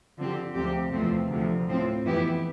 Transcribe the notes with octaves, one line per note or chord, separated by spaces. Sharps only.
D3 F3 C4 G4
D2 C3 F3 C4 G4
E2 C3 F3 A3 C4
D2 C3 F3
A2 F3 C4
F2 E3 B3 E4 G4